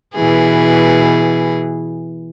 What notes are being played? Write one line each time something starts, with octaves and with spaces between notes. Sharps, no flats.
B2 E3 G#4